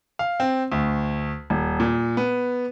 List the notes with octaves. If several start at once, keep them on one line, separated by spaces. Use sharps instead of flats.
F5
C4
D2
D#1
A#2
B3